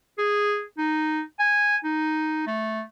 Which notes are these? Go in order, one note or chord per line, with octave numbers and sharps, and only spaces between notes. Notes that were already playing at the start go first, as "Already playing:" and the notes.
G#4
D#4
G#5
D#4
A3